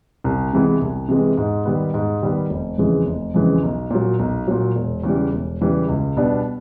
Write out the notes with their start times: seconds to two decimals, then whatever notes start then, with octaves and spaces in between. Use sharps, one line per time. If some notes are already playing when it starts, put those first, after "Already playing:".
0.24 C2
0.53 C3 E3 G#3 B3
0.81 C2
1.09 C3 E3 G#3 B3
1.37 G#2
1.65 D#3 G3 B3
1.94 G#2
2.22 D#3 G3 B3
2.50 F1
2.78 F2 C#3 E3 G#3
3.06 F1
3.34 F2 C#3 E3 G#3
3.63 B1
3.91 A#2 F#3
4.19 B1
4.48 A#2 F#3
4.76 E1
5.04 E2 C#3 E3 G3
5.32 E1
5.61 E2 C#3 E3 G3
5.89 C#2
6.17 B2 G3 B3 D4